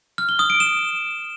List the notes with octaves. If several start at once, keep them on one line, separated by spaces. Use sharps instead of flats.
F6
G7
D#6
D7
E7